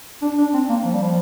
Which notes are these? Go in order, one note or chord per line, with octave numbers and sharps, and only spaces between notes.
D4
D4
C4
A#3
F3
G3
F3